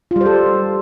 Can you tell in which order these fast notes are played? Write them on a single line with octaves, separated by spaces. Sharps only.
F4 G3 C5 A4